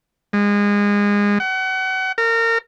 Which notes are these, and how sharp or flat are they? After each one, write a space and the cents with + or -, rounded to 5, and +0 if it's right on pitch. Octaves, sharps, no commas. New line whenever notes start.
G#3 -25
F#5 +35
A#4 -30